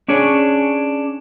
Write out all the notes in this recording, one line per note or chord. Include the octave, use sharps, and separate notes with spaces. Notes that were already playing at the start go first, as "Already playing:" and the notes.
C#4 D4 G#4 C#5